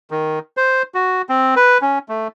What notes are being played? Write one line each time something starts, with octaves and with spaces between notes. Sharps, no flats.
D#3
C5
F#4
C4
B4
C#4
A3